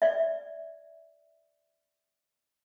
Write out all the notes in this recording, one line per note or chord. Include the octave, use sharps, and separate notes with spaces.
D5 E5